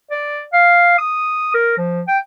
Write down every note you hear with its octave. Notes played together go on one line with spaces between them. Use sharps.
D5
F5
D#6
A#4
F3
G5